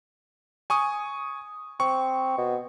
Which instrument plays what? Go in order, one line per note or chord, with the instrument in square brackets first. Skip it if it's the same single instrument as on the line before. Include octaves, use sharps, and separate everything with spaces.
[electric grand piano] G#5 C#6 D#6
[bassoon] C4 [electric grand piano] C#6
[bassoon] B2